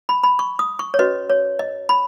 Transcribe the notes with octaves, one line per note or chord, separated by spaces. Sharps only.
B5
B5
C#6
D#6
C#6
C#5
C#4 F#4 B4 D#5
C#5
D#5
B5